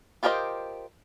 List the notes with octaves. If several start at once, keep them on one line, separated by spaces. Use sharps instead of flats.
F4 G4 A#4 C5 D#5